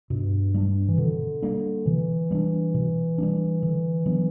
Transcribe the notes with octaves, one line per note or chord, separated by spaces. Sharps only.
G2 B2
G3 A#3 D4
E3
B2 D3
G3 A#3 D4
B2 E3
G3 A#3 D4
B2
G3 A#3 D4
D3
F#3 B3 D4